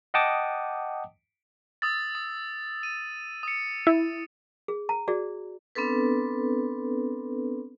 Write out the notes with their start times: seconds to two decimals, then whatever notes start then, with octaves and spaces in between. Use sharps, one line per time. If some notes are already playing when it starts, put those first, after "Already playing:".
0.14 D#5 F#5 G5 A5 D6 D#6
1.82 D#6 E6 A6
2.15 D#6
2.83 D#7
3.43 D#6 C#7
3.87 E4
4.68 G#4
4.89 A#5
5.08 F#4 G#4 D5
5.75 B3 C4 D4 A4 B4